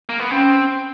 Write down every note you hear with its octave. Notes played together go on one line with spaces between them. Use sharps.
A#3
B3
C4 C#4